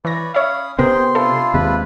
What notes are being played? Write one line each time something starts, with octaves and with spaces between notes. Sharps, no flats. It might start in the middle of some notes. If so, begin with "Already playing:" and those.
E3 B4 C#5 D5 A#6
C#4 C#5 E5 F5 B5 D#6
C3 B3 C4 G#4 A#4 G5 C6
D4 E4 F4 A4
D#2 C3 G#3 B4